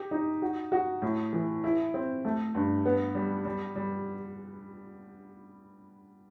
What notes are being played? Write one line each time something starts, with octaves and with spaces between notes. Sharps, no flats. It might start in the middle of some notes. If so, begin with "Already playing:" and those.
Already playing: G4
D#4
F#4
F#4
A2
E3
E4
C4
A3
G2
B3
G3
G3
G3